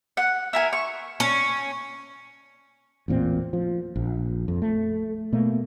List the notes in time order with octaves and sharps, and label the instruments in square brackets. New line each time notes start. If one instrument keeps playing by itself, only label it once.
[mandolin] F#5
E4 A#4 G#5
C#6
[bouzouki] C#4
[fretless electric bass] A1 E2 A#2 C4
F3
A#1
F2
A3
B2 A3 A#3